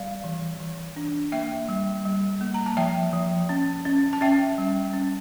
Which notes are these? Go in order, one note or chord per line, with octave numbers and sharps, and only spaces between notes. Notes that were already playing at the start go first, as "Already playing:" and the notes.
Already playing: G3 D5 F5
E3
E3
D4
A#3 E5 G5
G3
G3
A#3
A#5
A5
F3 E5 G5
F3
C#4
C#4
A5
C#4 E5 G5
G3
C#4